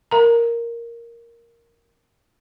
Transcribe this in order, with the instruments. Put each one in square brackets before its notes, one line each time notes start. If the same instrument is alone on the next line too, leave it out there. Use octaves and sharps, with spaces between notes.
[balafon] A#4 A#5